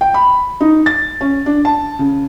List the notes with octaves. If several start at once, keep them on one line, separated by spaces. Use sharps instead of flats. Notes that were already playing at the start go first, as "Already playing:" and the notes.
G5
B5
D#4
A6
C#4
D4
A5
C#3